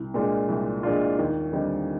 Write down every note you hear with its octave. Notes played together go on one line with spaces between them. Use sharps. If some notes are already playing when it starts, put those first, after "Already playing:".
Already playing: C2
A#2 G#3 D4 F4
C2
A#2 G#3 D4 F4
D#2
D3 G3 C4 D#4